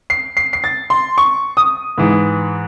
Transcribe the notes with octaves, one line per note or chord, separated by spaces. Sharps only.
C7
C7
C7
A6
C6
C#6
D#6
G#2 E3